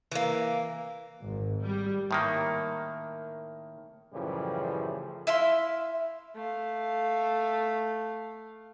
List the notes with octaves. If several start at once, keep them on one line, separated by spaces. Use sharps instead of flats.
E3 A#3
G#1
G3
A2 D#3 A#3
F#2 A2 C#3 E3 F3 G3
E4 E5 F5 C6
A3 F5